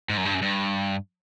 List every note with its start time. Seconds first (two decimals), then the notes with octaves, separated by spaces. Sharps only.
0.09 G#2
0.17 F#2
0.25 G2
0.34 F#2
0.42 G2